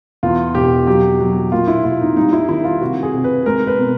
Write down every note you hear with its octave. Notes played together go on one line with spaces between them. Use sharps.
E2 F4
E1 G4
F#3 G4
F#3
A#2 F4
E4
A#2 F4
D#4
G3 D#4
E4
D#3 E4
F4
C3 F#4
G#4
C3
B4
G#3 A#4
B4
B2